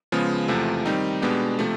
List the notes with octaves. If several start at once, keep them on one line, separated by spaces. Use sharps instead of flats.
C#3 F3 G#3 B3
E2 C3 F3 A3
D#3 G3 C4 D#4
B2 G#3 B3 D4 G4
C3 F3 A3